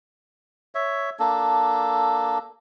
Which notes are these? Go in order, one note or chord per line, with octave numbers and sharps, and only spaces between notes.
C#5 E5
A#3 D4 A4